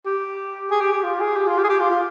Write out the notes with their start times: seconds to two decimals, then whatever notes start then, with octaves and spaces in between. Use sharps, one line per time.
0.05 G4
0.71 G#4
0.81 G4
0.92 G4
1.03 F4
1.20 G#4
1.36 G4
1.47 F4
1.58 G4
1.64 G#4
1.69 G4
1.80 F4
1.90 F4